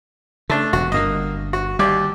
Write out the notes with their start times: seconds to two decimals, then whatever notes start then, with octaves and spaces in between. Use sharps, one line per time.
0.50 C#3 A3 D4
0.73 E1 F#4
0.92 G1 G2 D3 A#3 D#5
1.53 F#4
1.79 D#2 G3 G4 D5